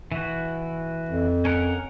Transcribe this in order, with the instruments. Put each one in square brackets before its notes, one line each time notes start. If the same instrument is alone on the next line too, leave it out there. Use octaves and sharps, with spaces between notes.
[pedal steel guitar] E3 F#4
[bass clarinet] F2
[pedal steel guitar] C#4 A#4 F#5